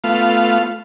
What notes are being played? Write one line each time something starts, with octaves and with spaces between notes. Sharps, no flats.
A3 B3 F4 F5